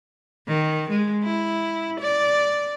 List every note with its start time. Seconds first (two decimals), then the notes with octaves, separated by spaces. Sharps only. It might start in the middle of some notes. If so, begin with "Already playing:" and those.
0.47 D#3
0.90 G#3
1.24 E4
2.00 D5